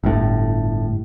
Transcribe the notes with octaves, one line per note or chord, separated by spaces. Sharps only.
G1 A2